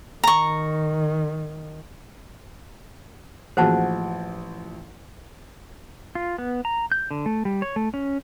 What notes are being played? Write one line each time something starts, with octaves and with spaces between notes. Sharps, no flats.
D#3 A#5 C#6
A1 F3 A#3 F#4 G#4 C5 F#5 A5
F4
B3
A#5
G6
D3
A3
G3
C#5
A3
C#4